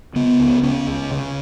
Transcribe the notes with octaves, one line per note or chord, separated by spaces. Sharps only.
C#3 B3
C#2
C#3 C#4
C#2
C#3